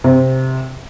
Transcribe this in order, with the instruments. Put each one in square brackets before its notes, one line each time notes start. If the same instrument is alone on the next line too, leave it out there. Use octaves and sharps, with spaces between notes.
[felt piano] C3